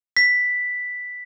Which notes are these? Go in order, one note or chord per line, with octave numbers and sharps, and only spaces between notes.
B6